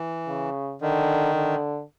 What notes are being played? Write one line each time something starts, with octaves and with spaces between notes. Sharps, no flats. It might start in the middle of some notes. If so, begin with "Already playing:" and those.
Already playing: E3
C#3
D3 D#3
D3